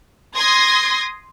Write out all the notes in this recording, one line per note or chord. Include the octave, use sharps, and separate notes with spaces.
C6 D#6 G#6 A#6